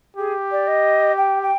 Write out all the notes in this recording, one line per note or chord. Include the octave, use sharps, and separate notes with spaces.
G4 G#4
D5
D#5
G5
G5